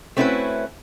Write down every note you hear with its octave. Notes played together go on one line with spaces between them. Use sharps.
A3 C4 C#4 E4 F#4 B4